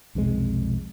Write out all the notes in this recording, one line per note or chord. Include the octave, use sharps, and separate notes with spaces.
B1 F2 C3 G#3